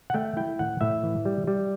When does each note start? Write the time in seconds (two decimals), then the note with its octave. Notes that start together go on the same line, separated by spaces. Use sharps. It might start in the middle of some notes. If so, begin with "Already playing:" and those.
0.10 F#5
0.14 A3 G5
0.37 E4 G5
0.59 A2 F#5
0.81 A2 E5
1.03 E3
1.25 G3
1.47 G3